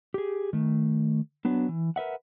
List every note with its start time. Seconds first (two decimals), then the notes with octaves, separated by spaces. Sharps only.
0.14 G4 G#4
0.53 D#3 A3
1.45 F#3 B3 D4
1.69 E3
1.96 A#4 B4 E5 F#5